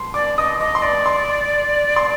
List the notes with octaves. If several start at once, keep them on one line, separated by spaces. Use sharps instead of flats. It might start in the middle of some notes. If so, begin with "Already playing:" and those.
Already playing: C6
D5 D6
D#5 D#6
D#5 D6
C6
D5 D6
C6
C6